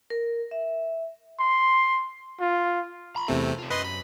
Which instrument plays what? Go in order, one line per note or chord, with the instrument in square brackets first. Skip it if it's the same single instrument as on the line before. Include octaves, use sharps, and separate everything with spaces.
[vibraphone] A#4
E5
[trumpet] C6
F4
[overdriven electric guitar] A#5 B5
[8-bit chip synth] E2 C3 A3 [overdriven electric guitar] C4
[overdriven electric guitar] A3 F4
[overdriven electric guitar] F#2 [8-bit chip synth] B4 D#5 C6
[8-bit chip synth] B5